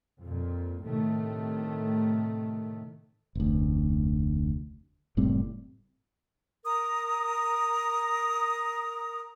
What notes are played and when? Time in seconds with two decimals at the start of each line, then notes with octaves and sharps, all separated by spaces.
0.22 F2 A#2
0.83 A2 C3 D#3 A3
3.35 F1 D2
5.17 F#1 A2 G3 C4
6.65 A#4 A#5 D#6